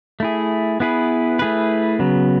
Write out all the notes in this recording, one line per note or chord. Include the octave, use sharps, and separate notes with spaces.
A3 E4 G#4
B3 E4 G#4 B4
A3 E4 G#4 B4
C#3 F#3 B3